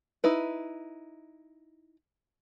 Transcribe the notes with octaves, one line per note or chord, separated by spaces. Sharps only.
D#4 E4 B4